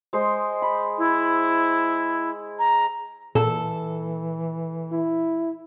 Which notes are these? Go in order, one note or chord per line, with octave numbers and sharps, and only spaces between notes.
G#3 C5 D#5
B5
E4
A#5
A#2 E3 A4
E4